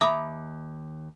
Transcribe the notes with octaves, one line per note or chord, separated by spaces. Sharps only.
D#2 E5 A#5 B5 D6 D#6